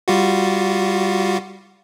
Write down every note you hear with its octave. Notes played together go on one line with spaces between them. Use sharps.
G3 F4 F#4